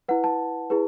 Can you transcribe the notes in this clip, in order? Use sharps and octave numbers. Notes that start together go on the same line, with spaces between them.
E4 B4 F#5
A5
E4 G#4 B4